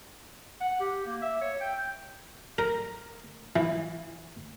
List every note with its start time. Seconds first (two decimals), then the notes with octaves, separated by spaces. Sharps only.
0.61 F#5
0.80 G4
1.06 A#3
1.22 E5
1.41 C#5
1.61 G5
2.58 A#4
3.56 E3